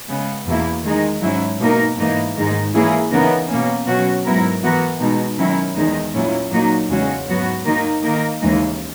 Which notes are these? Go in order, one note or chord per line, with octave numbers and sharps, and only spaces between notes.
C#3 G#3 B3
E2 B2 A#3 E4
D#3 G#3 D#4
G#2 F#3 C#4 E4
B2 A#3 D#4 A#4
G#2 E3 A#3 D#4
G#2 D#3 G#3 D#4
E3 A#3 C#4 E4 G#4
C#3 E3 B3 D#4 A#4
B2 A#3 C#4
B2 F#3 C#4 F#4
G#2 F#3 B3 E4 A#4
E3 B3 F#4 A#4
B2 G#3 D#4
D#3 F#3 C#4 E4
E2 D#3 G#3 D#4
A#2 F#3 C#4 E4
A#2 F#3 A#3 D#4 F#4
E2 C#3 G#3 C#4 F#4
G#2 F#3 B3 F#4
D#3 A#3 D#4 A#4
D#3 A#3 D#4 A#4
D#2 C#3 E3 G#3 D#4